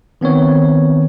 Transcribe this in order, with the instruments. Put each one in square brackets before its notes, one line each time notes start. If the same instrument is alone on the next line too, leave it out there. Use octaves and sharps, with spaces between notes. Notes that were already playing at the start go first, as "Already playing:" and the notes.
[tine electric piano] D#3 B3 C4 C#5